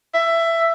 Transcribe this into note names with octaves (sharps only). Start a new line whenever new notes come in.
E5